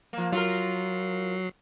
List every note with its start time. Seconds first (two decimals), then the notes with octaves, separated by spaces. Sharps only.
0.13 F3 A#3
0.32 F#3 F4 A#4 C7